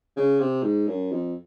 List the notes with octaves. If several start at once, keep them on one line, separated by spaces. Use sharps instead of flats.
C#3
C3
G#2
F#2
F2